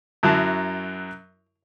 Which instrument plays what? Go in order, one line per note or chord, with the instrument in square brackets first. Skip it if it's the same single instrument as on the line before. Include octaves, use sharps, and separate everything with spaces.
[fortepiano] F#2 F#3 E4 A5